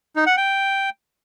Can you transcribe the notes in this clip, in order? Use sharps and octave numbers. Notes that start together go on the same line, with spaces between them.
D#4
F#5
G5